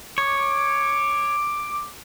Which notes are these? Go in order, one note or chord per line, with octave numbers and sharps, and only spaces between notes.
C#5 D6